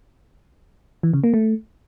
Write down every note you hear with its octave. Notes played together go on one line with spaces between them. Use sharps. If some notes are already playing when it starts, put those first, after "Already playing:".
E3
C#3
A#3
A3